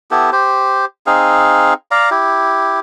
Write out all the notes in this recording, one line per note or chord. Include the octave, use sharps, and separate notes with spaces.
B3 E4 G4 A4
G4 C5
C4 D#4 G#4 F5
D5 F5 A#5
E4 G4